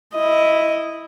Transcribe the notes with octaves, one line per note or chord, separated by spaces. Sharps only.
E4 D#5